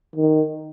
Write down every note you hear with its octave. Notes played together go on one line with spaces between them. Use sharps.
D#3